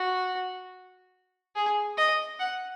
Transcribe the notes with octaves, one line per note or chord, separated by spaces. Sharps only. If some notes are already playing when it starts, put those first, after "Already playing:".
Already playing: F#4
G#4
D#5
F#5